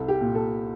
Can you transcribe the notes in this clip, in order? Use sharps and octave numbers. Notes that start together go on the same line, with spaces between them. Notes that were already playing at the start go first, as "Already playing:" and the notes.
Already playing: C2 A4
G4
A#2
A4